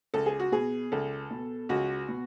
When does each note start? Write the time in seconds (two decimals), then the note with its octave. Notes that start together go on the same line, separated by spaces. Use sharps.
0.14 C#2 A4
0.26 G#4
0.40 F#4
0.52 B2 G#4
0.92 C#2 A4
1.31 B2
1.69 C#2 F#4
2.09 B2